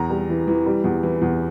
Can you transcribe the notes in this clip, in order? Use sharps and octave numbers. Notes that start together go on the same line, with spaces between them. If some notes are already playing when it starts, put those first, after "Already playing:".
Already playing: E2 A#5
G3
E3
E3
G3
E2
E3
E2